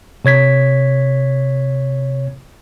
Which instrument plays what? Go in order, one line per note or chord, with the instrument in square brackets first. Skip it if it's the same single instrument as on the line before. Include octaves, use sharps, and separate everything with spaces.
[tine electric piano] C3 C#5 G#6 B6